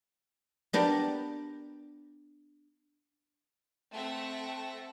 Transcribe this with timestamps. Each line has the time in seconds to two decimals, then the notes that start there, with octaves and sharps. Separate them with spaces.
0.73 B3 D4 G4 A#4
3.92 A3 C4 E5 F#5 A5 A#6